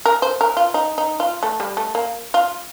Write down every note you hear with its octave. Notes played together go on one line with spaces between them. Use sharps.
A#4
C5
A#4
F4
D#4
D#4
F4
A3
G3
A3
A#3
F4